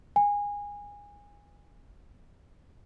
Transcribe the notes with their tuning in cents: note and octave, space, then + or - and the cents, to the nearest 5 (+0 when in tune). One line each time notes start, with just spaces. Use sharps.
G#5 -20